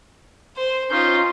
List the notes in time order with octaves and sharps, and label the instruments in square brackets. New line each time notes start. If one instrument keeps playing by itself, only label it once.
[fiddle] C5
[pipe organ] C#4 C6 G6 [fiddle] D#4 F4